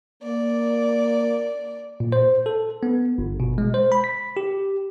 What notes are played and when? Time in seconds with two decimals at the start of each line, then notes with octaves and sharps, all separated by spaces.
0.23 A#3 D5
2.00 A#2
2.12 C5
2.46 A4
2.83 B3
3.18 G1
3.40 B2
3.58 G#3
3.74 C5
3.92 B5
4.04 B6
4.37 G4